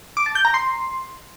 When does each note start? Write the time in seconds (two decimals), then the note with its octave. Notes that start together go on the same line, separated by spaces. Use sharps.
0.17 D6
0.26 A5
0.35 G6
0.45 A#5
0.54 C6